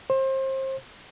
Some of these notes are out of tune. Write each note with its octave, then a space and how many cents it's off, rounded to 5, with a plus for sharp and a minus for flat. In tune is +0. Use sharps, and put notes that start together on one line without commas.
C5 +30